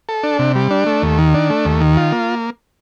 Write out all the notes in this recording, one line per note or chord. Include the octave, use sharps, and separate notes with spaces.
A4
D4
C3
G3
D4
A3
D#2
D#3
D4
A3
D#2
D#3
F4
A#3